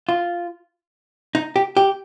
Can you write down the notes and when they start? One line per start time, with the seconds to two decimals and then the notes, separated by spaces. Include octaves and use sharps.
0.09 F4
1.35 D#4
1.56 G4
1.77 G4